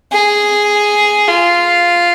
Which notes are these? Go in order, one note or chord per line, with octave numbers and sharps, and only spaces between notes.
G#4
F4